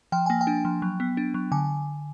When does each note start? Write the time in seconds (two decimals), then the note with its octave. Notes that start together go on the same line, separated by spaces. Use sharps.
0.12 F3 G5
0.26 A#3 G#5
0.41 G5
0.47 D4
0.65 F3
0.82 F#3
1.00 B3
1.17 D4
1.34 F#3
1.52 D3 G#5